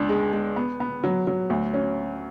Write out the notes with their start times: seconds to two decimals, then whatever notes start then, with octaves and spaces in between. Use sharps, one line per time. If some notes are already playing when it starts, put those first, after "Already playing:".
Already playing: C#2 D4
0.09 G#3
0.33 G#3
0.56 B3
0.80 B3
1.03 F#3
1.27 F#3
1.50 D2
1.74 C#4